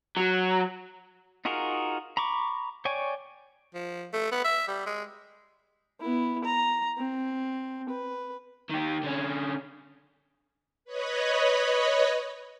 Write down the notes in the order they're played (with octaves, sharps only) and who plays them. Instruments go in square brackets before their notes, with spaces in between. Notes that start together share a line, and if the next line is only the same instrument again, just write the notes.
[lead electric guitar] F#3
[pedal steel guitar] D#4 F4 F#4 G#4 A#4
A#5 B5 C#6 D6
C#5 D5 G5 G#5 C#6
[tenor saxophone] F3
A3
B3
E5
G3
G#3
[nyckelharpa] B3 E4
A#5
C4
B4
[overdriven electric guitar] D#3 G4
D3 C#4
[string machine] B4 C#5 D#5 B5